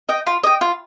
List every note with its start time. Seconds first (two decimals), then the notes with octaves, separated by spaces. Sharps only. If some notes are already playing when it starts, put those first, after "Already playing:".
0.09 D#5 G5
0.27 F4
0.43 D#5 G5
0.61 F4